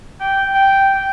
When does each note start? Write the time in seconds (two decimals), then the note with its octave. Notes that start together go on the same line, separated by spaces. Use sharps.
0.20 G5
0.54 G5
0.94 G5